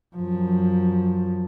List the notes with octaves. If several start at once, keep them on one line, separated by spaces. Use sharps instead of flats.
F#2 F3